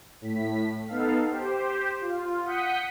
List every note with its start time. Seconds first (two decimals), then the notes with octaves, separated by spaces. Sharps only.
0.21 A2 B6
0.88 B3 D#4 A4 F5
1.28 G4 C5
2.01 F4
2.44 F#5 D#6 G6 B6 C#7